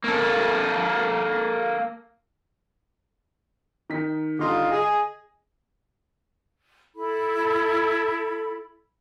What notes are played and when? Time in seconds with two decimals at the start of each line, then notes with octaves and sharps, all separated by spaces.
0.04 A#3 A4
3.90 D#3 D#4 B6
4.39 D3 G3 D#4 F4 C6
4.71 G#4 D#5
6.95 E4 A4 B5